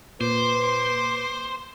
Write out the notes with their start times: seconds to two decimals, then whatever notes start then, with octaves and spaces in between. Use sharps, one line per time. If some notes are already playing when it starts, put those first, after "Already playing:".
0.21 A#2 B4 C5 C6 D6